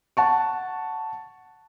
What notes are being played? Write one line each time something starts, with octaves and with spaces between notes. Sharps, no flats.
F#5 A5 C#6